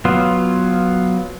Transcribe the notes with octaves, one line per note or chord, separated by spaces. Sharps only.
F#3 B3 F4